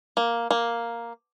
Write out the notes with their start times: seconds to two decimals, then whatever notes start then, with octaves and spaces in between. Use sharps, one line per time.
0.17 A#3
0.51 A#3